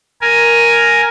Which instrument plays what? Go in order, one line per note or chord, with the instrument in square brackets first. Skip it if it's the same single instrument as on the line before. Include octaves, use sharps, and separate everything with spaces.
[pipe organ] A#4 G#5